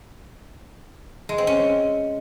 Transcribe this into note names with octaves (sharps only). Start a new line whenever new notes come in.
G#3
C4
C#4